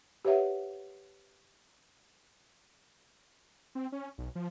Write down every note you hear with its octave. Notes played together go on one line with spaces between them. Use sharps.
G4 B4 C#5 E5 F#5
C4
C#4
B1
F3